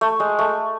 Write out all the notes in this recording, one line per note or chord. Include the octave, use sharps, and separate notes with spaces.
A3
G#3
A3